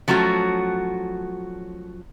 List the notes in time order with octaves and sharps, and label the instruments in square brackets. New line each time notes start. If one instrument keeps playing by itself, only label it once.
[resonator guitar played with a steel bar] F3 F#3 A3 C#4 F#4